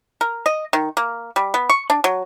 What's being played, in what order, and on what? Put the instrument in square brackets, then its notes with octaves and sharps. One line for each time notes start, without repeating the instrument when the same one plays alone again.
[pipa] A#4
D#5
D#3
A#3
G3
B3
C#6
D4
F#3